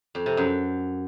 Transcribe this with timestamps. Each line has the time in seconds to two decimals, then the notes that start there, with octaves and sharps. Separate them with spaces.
0.15 F2
0.26 C3
0.37 F#2